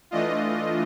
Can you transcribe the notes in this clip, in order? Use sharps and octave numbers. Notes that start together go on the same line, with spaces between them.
E3 A3 D4 F4 D#5